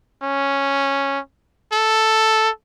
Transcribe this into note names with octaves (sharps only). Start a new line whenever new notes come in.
C#4
A4